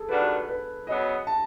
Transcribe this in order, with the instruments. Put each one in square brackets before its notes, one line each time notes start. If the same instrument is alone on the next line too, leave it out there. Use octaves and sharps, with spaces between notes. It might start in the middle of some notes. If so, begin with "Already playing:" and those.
Already playing: [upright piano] G#4 A4
[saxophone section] D#3 G3 B3 D4 F#4 [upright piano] B4
[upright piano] B4
[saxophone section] C#3 F#3 B3 [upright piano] D#5
[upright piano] A5